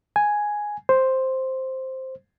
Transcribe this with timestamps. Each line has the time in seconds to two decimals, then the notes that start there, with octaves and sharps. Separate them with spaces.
0.16 G#5
0.89 C5